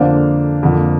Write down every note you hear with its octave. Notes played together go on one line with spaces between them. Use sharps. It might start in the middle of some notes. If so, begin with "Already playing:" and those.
Already playing: F2 D3 A#3 D4 C5 F5
F2 D3 A#3